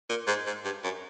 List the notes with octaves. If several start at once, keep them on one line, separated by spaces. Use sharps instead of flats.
A#2
G#2
G#2
G2
F#2